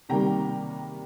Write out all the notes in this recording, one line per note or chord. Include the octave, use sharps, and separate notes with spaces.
C3 D#3 G3 A#3 G5 A#5